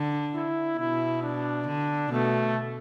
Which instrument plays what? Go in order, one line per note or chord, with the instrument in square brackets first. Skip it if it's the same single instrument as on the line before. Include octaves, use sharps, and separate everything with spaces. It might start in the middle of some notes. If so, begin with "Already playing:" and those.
Already playing: [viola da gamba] D3
[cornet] E4
[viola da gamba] B2 [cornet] E4
[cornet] D4
[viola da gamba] D3
[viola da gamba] B2 [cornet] A3